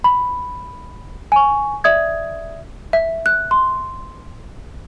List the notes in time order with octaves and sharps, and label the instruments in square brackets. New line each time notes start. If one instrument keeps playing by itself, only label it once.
[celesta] B5
G#5 C#6
D5 E5 D#6 G#6
[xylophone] E5
F#6
C6